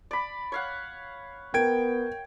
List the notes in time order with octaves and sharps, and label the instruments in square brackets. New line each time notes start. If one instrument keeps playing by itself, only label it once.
[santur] D5 B5
C#5 F5 F#5
[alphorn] B3 [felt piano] A#4 [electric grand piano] G5 G#6 D7